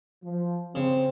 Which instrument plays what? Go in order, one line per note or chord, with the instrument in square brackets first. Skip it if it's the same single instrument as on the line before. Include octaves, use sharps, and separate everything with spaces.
[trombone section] F3
[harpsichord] C#3 [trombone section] C4